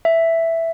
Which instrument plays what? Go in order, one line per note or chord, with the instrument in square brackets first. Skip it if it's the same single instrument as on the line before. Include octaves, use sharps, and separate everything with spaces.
[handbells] E5